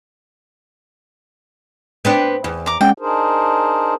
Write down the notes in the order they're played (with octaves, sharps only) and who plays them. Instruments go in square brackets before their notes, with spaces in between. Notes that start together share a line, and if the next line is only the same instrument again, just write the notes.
[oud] B3 C4 D4
E2
[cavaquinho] A#5 D6
[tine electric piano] G#3 C#4 F#5 [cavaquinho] G5
[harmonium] D4 D#4 G#4 A#4 C5